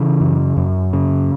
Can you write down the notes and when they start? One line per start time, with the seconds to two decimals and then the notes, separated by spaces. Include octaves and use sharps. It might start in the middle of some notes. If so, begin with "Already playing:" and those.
Already playing: C#3 E3
0.20 F#2
0.57 F#2
0.93 C#3